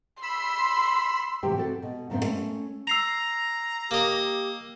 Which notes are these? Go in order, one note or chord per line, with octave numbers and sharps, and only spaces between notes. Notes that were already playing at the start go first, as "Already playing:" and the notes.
B5 C6 E6
A2 C3 E3 F#3 G4 G5
C4 F#4 A4
B2
F#2 A2 C#3 B3 C4 E5
A3 C#4
A#5 E6 C7 F7
A#3 G4 D#5